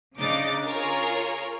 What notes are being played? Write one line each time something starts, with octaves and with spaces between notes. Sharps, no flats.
C#3 D4 D#4 D6 A6
F4 G#4 A#4 C#5